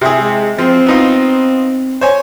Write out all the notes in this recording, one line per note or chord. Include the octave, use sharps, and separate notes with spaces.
C3 E4 G#4
G#3
F3 C4
B3 D#4 F4
C5 C#5 G#5